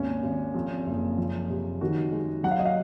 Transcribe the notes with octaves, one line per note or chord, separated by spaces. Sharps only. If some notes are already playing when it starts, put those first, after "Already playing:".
Already playing: G#1 D#2 C#4
G#1
F2
F#1
F3
C3
D#3 F#4
G#3
F#3 F#5
F5
D#5
F5